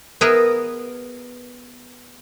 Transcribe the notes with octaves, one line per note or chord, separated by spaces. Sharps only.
B3 G#4 A#4 B4 D#5 E5